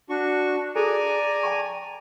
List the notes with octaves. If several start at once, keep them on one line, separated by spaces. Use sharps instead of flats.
D4 F#4 C#6
G#4 A4 D5 G#5 A#5
G5 A5 C#6